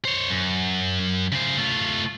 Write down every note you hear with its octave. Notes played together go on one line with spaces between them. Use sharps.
C5 C#5
F#2
C#3 C5
A3 F4